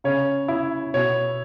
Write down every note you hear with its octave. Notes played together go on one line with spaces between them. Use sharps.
C#3 C#5
E4
B2 C#5